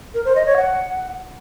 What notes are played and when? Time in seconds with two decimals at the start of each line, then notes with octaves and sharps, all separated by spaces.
0.14 A#4
0.25 C5
0.36 D#5
0.46 C#5
0.57 F#5